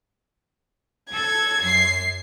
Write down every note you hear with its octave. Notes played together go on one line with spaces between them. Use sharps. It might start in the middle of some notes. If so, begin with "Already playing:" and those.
A4 G#6
F#2 C7